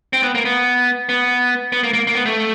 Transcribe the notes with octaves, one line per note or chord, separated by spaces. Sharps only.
C4
B3
A#3
B3
B3
B3
A#3
A#3
A#3
B3
A3